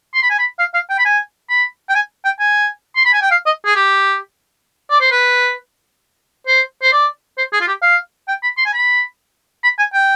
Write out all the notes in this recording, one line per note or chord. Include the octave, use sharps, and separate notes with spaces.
C6
B5
G#5
B5
F5
F5
G5
B5
G#5
B5
G5
G#5
G5
G#5
C6
B5
G#5
G5
F5
D#5
G#4
G4
D5
C5
B4
C5
C5
D5
C5
G#4
F4
G4
F5
G5
B5
C6
G#5
B5
B5
G#5
G5